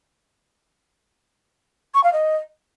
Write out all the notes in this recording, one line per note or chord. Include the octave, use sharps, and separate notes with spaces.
C#6
F5
D#5